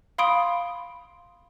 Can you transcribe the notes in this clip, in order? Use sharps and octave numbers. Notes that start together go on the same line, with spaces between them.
F5 B5 C6 D#6 D7